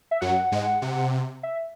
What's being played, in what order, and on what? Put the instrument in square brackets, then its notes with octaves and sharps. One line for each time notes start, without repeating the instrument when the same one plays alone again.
[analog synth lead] E5
[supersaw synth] F#2 F#3 [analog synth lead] F#5
[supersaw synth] G#2 G#3
C3
[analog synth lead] E5